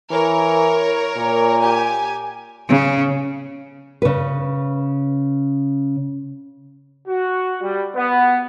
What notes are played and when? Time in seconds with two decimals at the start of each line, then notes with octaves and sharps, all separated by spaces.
0.11 E3 A#4 C#5
1.16 A#2
1.61 G4 G#5
2.69 C#3
4.02 C#3 B4
7.08 F#4
7.62 G3
7.96 B3